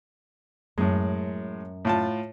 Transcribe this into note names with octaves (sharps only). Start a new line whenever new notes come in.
F#2 A2 G#3
A2 F4 A5